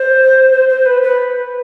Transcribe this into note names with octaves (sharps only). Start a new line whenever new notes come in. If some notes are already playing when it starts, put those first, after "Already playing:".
Already playing: C5
C5
C5
B4
B4